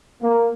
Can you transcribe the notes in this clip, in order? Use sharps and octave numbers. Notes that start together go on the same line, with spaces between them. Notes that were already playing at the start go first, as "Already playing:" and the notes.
A#3